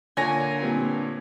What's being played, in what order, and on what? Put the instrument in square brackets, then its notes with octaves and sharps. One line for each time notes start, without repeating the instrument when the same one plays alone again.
[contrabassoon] A#2 [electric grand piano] D3 C#5 A#6 [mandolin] G#5
[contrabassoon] G2 [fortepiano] A#2 C4